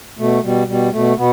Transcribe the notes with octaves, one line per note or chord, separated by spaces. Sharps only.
B2 A3
B2 G3
B2 G3
B2 A3
B2 B3